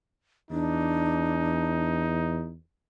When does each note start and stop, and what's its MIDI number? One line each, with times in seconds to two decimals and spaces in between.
0.51 2.55 40
0.51 2.02 62
0.51 2.52 63